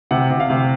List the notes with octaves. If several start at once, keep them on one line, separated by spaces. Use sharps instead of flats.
C3 F#5
C3
F5
C3